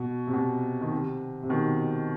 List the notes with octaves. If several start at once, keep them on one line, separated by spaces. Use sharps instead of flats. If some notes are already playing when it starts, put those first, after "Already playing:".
Already playing: B2
C3
B2
D#3
C3
C3
B2 D#3